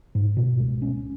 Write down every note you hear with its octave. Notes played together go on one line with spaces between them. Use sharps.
G#2
B2
C#2
C#4